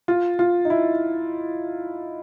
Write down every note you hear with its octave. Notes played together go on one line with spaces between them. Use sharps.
F4
F4
D#4
E4